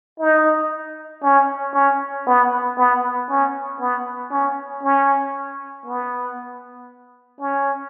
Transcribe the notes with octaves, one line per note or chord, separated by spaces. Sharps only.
D#4
C#4
C#4
B3
B3
C#4
B3
C#4
C#4
B3
C#4